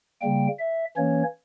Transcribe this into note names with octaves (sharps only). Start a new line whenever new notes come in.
C#3 G3 A#3 G5
E5
E3 A#3 C#4 C#5